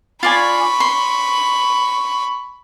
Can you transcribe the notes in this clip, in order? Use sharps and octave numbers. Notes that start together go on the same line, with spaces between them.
F4 D5 G#5 B5 C#6
C6